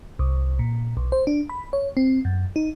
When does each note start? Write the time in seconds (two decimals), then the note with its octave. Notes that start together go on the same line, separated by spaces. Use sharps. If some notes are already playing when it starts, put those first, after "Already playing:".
0.19 C2
0.59 A#2
0.97 B1
1.12 C5
1.27 D4
1.49 B5
1.73 C#5
1.97 C4
2.25 F#2
2.56 D#4